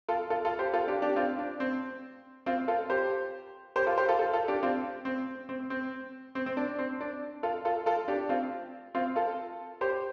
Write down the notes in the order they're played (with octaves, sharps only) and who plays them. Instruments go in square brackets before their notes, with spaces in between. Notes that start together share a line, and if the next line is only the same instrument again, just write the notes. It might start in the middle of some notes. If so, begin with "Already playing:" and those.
[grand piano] F4 A4
F4 A4
F4 A4
G4 C5
F4 A4
D4 G4
D4 G4
C4 F4
D4
C4
C4 F4
F4 A4
G4 C5
G4 C5
F4 A4
G4 C5
F4 A4
F4 A4
F4 A4
D4 G4
C4 F4
C4
C4
C4
C4
C4
D4
C4
D4
F4 A4
F4 A4
F4 A4
D4 G4
C4 F4
C4 F4
F4 A4
G4 C5